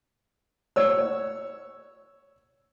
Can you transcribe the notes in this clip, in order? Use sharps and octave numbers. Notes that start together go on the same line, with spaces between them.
C#5 E6